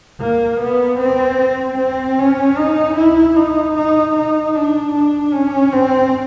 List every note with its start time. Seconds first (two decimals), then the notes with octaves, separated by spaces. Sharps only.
0.21 A#3
0.61 B3
0.99 C4
1.78 C4
2.19 C#4
2.58 D#4
2.97 E4
3.36 D#4
3.77 D#4
4.16 D#4
4.56 D4
4.94 D4
5.33 C#4
5.73 C4